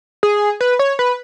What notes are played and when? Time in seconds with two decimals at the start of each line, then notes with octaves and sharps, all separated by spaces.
0.23 G#4
0.61 B4
0.79 C#5
0.99 B4